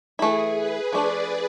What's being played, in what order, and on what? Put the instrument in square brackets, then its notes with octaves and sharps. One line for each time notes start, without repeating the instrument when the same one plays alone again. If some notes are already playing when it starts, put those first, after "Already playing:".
[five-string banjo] E3 A3 E4 [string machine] G#4
[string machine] B4
[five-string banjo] F3 A3 D4 [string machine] D5